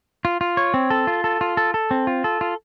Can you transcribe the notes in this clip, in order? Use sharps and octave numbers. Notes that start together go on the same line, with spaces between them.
F4
F4
C#5
C4
A4
F4
A4
F4
A4
A4
C4
F4
A4
F4